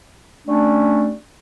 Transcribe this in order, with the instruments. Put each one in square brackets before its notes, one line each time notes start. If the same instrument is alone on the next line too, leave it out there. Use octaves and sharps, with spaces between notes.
[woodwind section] G3 A3 C#4 D4